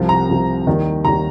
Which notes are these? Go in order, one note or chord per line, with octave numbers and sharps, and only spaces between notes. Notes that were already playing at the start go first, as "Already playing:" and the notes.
Already playing: C2 C3 F3
A#5
C2 C3 F3
D#2 D#3 G3
D#2 D#3 G3 A#5